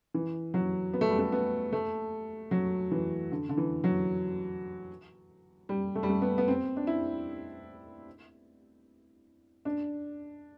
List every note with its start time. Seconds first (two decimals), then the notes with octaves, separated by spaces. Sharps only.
0.14 E3
0.54 F#3
0.94 B3
1.01 A3
1.10 G3
1.19 A3
1.32 B3
1.73 A3
2.51 F#3
2.91 E3
3.32 D3
3.49 D3
3.57 E3
3.84 F#3
5.69 G3
5.95 A3
6.03 G3
6.10 A3
6.22 B3
6.38 B3
6.48 C4
6.77 D4
6.87 E4
9.65 D4